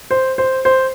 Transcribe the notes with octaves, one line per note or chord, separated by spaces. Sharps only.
C5
C5
C5